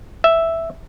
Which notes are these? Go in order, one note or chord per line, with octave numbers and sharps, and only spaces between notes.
E5